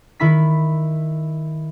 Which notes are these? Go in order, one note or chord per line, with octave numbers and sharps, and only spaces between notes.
D#3 E4 B5 B6